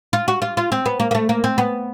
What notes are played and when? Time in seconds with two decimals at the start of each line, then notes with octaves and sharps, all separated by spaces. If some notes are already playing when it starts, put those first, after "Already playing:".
0.13 F4
0.28 F#4
0.42 F4
0.57 F4
0.72 C4
0.86 B3
1.00 A#3
1.11 A#3
1.15 A3
1.29 A#3
1.44 C4
1.58 B3